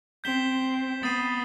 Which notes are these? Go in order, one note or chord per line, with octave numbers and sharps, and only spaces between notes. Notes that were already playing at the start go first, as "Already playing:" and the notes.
C4 G6 B6 E7 G7
B3 D#6 A6 C7 D#7